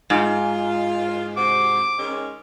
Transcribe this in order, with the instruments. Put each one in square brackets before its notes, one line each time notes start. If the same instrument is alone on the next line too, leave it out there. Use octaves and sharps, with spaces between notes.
[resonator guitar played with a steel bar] G#2 [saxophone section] F4
[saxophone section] C3 F#4 C5 [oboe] D6
[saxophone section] D#3 G#3 C#4